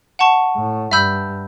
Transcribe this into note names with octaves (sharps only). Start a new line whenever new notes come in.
F#5 A5 C#6
A2
G2 E5 B5 E6 G6